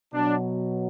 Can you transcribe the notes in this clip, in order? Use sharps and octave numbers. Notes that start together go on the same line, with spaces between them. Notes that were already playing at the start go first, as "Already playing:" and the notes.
B2 F#3 D4